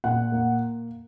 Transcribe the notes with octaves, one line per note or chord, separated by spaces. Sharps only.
A#2 F#5
A#3